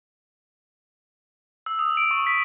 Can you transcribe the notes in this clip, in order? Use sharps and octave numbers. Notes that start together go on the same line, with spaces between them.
E6
D#6
D7
C#6
B6